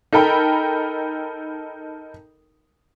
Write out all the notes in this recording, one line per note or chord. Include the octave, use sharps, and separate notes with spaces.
D#4 A4 A#4 G5 B5